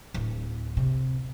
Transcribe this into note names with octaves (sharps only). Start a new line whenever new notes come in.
D1
C3